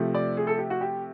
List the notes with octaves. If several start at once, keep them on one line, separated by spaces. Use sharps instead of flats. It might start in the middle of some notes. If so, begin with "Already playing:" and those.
Already playing: C3 F3 A3
D5
G#4
A4
G4
F#4
G4